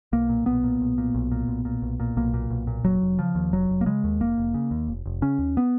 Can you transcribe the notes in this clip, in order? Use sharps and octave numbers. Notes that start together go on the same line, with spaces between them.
B1 A#3
A#2
B1 B3
A#2
B1
A#2
B1
A#2
B1
A#2
B1
A#2
B1 A#3
A#2
B1
A#2
F1 F#3
F1
C#3 F3
D#2
F1 F#3
F1
A#3
C#3 G#3
D#2
F1 A#3
F1
C#3
D#2
F1
F1
C#3 C#4
D#2
B3